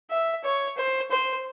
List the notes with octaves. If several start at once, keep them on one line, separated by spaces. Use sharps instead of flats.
E5
C#5
C5
C5